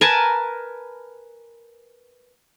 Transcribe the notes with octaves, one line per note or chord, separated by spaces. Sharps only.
A#4 B4 G#5 A5